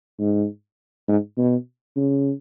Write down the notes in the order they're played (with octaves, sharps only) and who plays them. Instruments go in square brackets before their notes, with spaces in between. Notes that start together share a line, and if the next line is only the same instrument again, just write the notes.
[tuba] G#2
G#2
B2
C#3